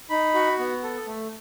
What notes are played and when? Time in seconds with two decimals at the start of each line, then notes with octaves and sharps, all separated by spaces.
0.10 D#4 B5
0.34 F#4
0.59 B3
0.83 A4
1.07 A3